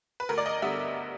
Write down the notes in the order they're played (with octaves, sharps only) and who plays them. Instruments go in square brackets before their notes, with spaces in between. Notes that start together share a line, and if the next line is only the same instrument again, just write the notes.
[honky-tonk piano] B4
D2 A#4
D5
D#5
D3 G3 B3 E5